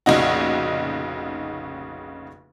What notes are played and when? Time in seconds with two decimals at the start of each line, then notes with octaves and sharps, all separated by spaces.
0.06 F1 A#1 C#3 D#4 F#4